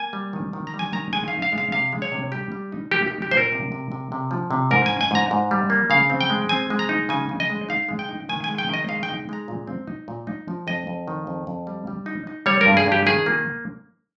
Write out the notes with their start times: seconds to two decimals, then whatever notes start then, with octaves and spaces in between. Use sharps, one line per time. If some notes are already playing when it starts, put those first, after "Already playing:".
Already playing: A#3 G#5
0.13 G3
0.33 D#3
0.53 D#3
0.67 A#5
0.74 G3
0.79 G#5
0.93 D#3 A#5
1.13 G#3 G#5
1.28 F5
1.33 D#4
1.42 F5
1.52 G#3
1.58 F5
1.72 C3 F5
1.92 G#3
2.02 C#5
2.12 C3
2.32 G3 G4
2.52 G3
2.72 D#4
2.91 A#3 G4
3.08 D#4 G4
3.22 G4
3.31 A#2 C5
3.37 A#4
3.52 C3
3.72 C3
3.92 C3
4.12 C3
4.31 F3
4.51 C3
4.71 G#2 A#4
4.86 G#5
4.91 C#4
5.01 G#5
5.11 G#2 A#5
5.31 G#2
5.51 G3
5.70 A#3
5.90 C#3 F5
6.10 C4
6.21 G5
6.30 G#3
6.49 C4 G#5
6.70 G#3
6.79 A#5
6.89 D#4
7.09 C#3 G#5
7.29 C#3
7.40 D#5
7.50 G#3
7.69 D#4 F5
7.89 G#3
7.99 G5
8.09 D#4
8.29 D#3 G#5
8.44 G#3 G#5
8.58 G5
8.68 D#3
8.74 D#5
8.88 G#3 F5
9.03 G5
9.09 D#4
9.29 G#3 A#5
9.48 A#2
9.67 C4
9.87 D#4
10.08 A#2
10.27 D#4
10.48 F3
10.67 F2 D#5
10.87 F2
11.08 D#3
11.27 F2
11.47 F2
11.67 G3
11.87 G3
12.06 D#4
12.27 D#4
12.46 G3 C#5
12.61 A#4
12.66 G2
12.77 G#4
12.86 G2
12.92 G4
13.06 D#3 G#4
13.26 A#3